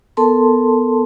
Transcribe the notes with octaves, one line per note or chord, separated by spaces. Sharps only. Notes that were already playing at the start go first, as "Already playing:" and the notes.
B3 A4 A#4 A5 C6